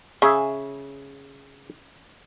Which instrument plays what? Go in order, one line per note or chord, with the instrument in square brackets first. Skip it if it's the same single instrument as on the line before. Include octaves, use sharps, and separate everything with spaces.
[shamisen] C#3 [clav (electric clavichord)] G#4 E5